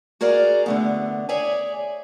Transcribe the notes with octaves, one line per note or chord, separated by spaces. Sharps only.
F#4 G#4 A#4 D5 F5
D3 A3 B3
G#4 C#5 D5 E5 G#5